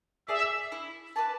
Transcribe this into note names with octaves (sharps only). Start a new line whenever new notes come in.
G#4 D5 E5
E4
B4 D5 A5